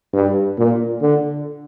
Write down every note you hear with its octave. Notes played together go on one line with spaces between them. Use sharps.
G2
A#2
D3